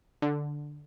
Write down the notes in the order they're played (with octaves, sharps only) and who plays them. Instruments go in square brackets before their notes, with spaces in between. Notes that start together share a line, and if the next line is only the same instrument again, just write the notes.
[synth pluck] D3